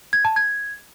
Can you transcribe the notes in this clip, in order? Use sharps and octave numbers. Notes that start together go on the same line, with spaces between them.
G#6
A5
G#6